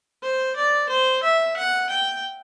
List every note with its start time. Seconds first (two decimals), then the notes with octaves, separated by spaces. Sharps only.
0.23 C5
0.56 D5
0.89 C5
1.23 E5
1.57 F#5
1.90 G5